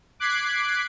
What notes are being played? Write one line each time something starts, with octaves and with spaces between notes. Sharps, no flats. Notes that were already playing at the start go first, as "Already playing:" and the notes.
D6 F#6 G#6 B6 C7 D7